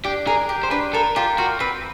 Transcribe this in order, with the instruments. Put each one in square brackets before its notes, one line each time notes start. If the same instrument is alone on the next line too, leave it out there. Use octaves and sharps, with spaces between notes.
[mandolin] D4 [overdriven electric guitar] G4
[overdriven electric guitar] G#4 [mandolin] A#4
[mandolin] G4
[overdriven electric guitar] C5
[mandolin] D4 [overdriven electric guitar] B4
[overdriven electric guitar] A4 [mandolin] A#4
[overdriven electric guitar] F4 [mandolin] G4
[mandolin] F4 [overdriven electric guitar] F#4
[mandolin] C4 [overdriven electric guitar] B4